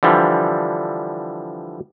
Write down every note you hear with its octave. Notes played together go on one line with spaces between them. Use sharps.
D3 E3 F3 G3